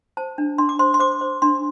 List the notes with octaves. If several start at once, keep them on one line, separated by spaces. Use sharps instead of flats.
C5 A5
D4
D4 C6
D6
C5 C6
C6
C5 D6
C5
D4 C6